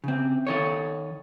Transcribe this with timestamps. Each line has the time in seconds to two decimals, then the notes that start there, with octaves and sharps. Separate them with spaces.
0.04 C#3 C4
0.47 D#3 A4 C#5